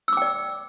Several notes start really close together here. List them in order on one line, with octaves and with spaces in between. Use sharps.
E6 D6 G5 D5